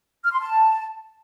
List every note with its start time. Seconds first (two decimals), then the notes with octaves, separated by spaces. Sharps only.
0.24 F6
0.32 C6
0.40 A5